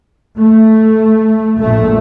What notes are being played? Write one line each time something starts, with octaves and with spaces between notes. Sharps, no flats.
A3
A#1 A#2 A3